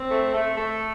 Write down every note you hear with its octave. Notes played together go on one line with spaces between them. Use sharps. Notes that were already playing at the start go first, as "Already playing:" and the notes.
Already playing: C4
A3
A3
A3